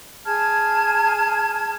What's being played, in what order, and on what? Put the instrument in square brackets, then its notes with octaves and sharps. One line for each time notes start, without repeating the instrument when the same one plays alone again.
[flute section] G#4 A5 F6 G#6